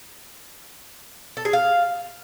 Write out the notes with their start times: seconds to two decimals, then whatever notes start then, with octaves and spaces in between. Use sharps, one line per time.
1.37 A4
1.45 G#4
1.53 F5